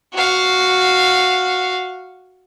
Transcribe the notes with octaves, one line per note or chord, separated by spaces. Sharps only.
F#4 F5